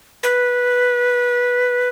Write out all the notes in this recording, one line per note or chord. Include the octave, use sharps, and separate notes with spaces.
B4